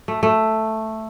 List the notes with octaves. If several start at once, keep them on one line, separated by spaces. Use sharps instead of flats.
A3
A3